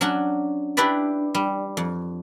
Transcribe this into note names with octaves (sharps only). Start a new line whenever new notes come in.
F#3 C#4 D4 F#4
D4 E4 G4 B4 D5
G3
F2